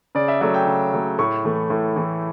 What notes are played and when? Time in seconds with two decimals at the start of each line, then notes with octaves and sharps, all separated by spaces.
0.15 C#3 D5
0.28 E5
0.41 F#3 A3 E5
0.54 G5
0.66 C#3
0.93 F#3 A3
1.19 A2 C#6
1.44 E3 A3
1.70 A2
1.96 E3 A3